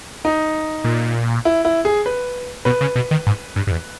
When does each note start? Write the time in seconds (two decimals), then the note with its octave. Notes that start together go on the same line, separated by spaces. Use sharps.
0.25 D#4
0.84 A#2
1.45 E4
1.65 E4
1.85 G#4
2.06 B4
2.65 B2 B4
2.81 C#3
2.96 B2
3.11 D#3
3.27 G#2
3.56 G2
3.67 G2
3.71 E2